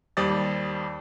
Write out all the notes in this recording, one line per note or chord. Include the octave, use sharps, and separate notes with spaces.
D#2 G3 C5 D5 D#6 A6